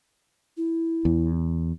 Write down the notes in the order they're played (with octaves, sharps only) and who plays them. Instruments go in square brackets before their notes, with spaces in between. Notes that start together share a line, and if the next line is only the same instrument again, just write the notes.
[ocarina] E4
[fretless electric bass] E2